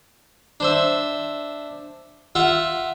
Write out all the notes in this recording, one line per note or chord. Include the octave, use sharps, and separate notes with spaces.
D4 C5 E5
F4 E5 F#5